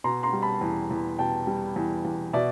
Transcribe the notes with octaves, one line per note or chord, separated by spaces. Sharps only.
B2 A#5 C6
A#5 C6
G3
A5 B5
E2
E2
B2 G5 A5
G3
E2
E2
B2 D5 E5